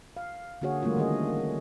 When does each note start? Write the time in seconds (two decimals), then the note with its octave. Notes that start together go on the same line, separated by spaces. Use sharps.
0.17 F5
0.62 D3 A#3 F#4 G#4 C#5
0.83 E3 G3 A3 A#3 C4 F4
0.96 D3 D#3 C#4 G#4 D#5